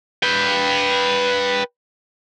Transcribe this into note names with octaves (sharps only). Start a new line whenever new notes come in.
B4 G5